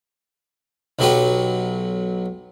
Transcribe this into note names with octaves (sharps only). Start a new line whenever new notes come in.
B1 F#3 G4 B4